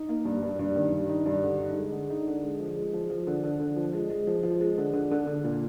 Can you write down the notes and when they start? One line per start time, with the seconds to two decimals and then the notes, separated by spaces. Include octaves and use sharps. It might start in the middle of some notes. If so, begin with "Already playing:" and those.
Already playing: D#4
0.09 A#3
0.25 G2
0.42 G2
0.59 G2
0.76 D#3
0.92 G2
1.09 D#4
1.26 G2
1.43 D3
1.60 D#4
1.76 G#3
1.92 D3
2.10 D#4
2.26 D3
2.43 G#3
2.60 F3
2.76 G#3
2.94 F3
3.10 F3
3.27 D3
3.44 D3
3.60 D3
3.76 F3
3.93 G#3
4.10 G#3
4.27 F3
4.43 F3
4.61 G#3
4.78 D3
4.93 D3
5.11 D3
5.27 D3
5.44 A#2